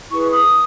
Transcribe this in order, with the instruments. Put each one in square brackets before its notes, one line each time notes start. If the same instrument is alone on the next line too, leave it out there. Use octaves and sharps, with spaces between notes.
[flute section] E4 G#4 B4 C#6
D#6